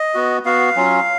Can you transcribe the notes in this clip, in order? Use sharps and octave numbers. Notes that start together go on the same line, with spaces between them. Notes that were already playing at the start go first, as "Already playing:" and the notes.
Already playing: D#5
B3 F#4
B3 F#4 F5
F#3 C#4 F4